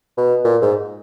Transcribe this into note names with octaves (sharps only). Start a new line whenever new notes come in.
B2
A#2
G#2